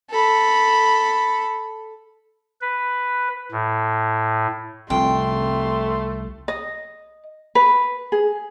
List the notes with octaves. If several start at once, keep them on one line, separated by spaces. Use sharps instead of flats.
A4 B5
B4
A2
C2 C3 F3 A3 G5 C6
D#5
B4
G#4